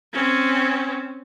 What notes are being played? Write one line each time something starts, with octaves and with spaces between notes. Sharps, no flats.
C4 C#4